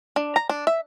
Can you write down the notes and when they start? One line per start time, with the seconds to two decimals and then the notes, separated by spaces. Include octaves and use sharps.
0.16 D4
0.36 A#5
0.50 D4
0.67 E5